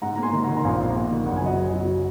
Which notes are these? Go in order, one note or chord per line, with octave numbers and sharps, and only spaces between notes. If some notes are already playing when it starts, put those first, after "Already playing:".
G#2 F#5 A#5
A#3 A#5
G#5 C6
D#3
D#3 F#5 A#5
A#5
A#1 F5 G#5
A#1
A#3
D#3
F#1 F#5
G#5
F#3 D#5 F#5
F#1
F#3